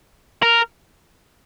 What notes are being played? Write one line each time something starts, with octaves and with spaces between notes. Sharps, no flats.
A#4